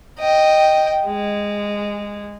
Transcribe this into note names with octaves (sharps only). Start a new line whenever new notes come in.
D#5 G5
G#3